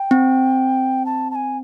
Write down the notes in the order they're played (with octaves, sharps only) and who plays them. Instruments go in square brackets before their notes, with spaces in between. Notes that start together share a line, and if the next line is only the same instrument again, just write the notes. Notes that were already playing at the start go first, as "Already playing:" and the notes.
Already playing: [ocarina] G5
[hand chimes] C4
[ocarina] A5
A5
G#5